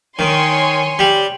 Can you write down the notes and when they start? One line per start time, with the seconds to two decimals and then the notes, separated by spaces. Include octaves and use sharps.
0.19 D#3 C#5 G#5 C6
0.99 G3